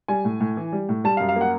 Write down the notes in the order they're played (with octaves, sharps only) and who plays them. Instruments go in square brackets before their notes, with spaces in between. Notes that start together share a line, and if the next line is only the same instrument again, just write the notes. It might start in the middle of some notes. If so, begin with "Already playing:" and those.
[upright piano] G3 G#5
A2
A2
E3
G3
A2
G3 A5
F5
F#2
F5
A#3 F#5